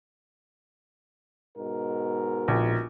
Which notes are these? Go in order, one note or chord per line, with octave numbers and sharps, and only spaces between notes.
G#2 B2 A#4
A#1